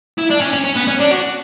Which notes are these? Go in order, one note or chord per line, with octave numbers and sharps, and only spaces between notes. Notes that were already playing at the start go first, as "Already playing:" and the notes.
E4
D4
C#4
C#4
C#4
B3
C#4
D4
F#4